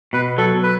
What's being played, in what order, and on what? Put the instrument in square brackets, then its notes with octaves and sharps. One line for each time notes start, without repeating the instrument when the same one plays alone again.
[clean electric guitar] B2 [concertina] B4
[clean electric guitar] F#3 [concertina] A4
[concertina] B4